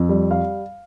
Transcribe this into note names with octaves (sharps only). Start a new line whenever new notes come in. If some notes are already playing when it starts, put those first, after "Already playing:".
Already playing: F2
G3
F5